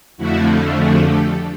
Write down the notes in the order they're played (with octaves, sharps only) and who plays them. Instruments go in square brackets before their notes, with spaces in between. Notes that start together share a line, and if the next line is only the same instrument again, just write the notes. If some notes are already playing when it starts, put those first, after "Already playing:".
[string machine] F2 D3 F3 A3 E4 F#4
F#4 G#4
G4 A4